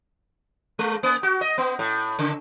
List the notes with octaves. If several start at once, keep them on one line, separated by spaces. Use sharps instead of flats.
G#3
A#3
F#4
D#5
B3
A2
C#3